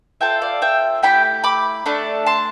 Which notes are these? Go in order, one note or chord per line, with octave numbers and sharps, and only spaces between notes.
C4 F4 A4 E5 G5
D5 F5
E5 G5
A3 E4 G4 G5 B5
B5 D6
A3 D4 A4
A5 C6